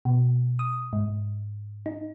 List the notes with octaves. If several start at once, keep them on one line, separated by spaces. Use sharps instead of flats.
B2
D#6
G#2
D#4